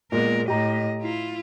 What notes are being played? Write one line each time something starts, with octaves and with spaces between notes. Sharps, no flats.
A#2 G#3 B3 A#4
A2 G4 D#5 A#5
E4 F4